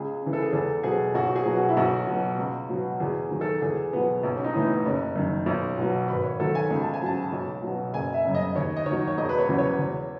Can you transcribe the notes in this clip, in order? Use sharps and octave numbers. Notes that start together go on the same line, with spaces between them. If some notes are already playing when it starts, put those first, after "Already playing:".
Already playing: C#2 G#4
C#3 E3
A4
G#4
E2 A4
B2 F#3 G#4
B1 F#4
F#4
G#4
B2 F#3
F#4
E4
B1 F#4
B2 F#3
C#2
B2 F#3
E2 G#4
D#3 F#3
A4
E2 G#4
B2 F#3 B3
B1
C#4
D#4
A2 E3
B3
F#1 C#4
F#2 D#3
B1
B2 F#3
G#1 B4
C#5
G#2 D#3 F#3 A4
G#5
C#2
A5
G#5
C#3 F#3 A5
B1
B2 F#3
F#1 G#5
E5
F#2 C#3
D#5
D#2 C#5
D#5
D#3 F#3 C#5
C#5
E1 D#5
B4
C#5
E2 C#3 F#3
C#5
E2